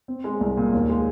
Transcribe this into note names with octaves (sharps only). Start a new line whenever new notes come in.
C4
G#3
C2
A#2
D#2
G#3